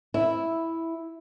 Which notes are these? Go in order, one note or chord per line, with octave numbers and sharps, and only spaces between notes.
E4